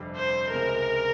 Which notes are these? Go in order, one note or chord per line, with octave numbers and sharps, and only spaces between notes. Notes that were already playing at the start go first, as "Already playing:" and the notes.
Already playing: G1 F2 C3 G3
C5
C#2 C3 F3 G#3 A#4